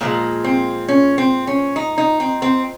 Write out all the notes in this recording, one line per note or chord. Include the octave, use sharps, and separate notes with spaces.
A#2 F3 G#3 A#3
C4
C#4
C4
C#4
D#4
D#4
C4
C4